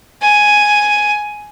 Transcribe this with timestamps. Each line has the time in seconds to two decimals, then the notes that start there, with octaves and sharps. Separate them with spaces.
0.22 G#5